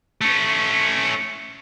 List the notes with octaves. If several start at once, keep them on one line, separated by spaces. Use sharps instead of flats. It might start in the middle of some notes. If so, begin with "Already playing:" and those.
A3 C#4